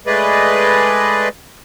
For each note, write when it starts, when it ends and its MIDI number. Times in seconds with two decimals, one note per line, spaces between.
0.07 1.28 56
0.07 1.28 57
0.07 1.28 68
0.07 1.28 71
0.07 1.28 74
0.07 1.28 75